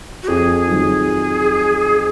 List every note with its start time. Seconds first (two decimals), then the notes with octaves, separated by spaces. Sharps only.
0.23 F#4
0.28 F2 G#4
0.67 D#3 F#3